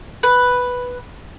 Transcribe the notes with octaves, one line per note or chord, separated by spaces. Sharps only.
B4